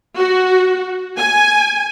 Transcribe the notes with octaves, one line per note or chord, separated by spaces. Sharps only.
F#4
G#5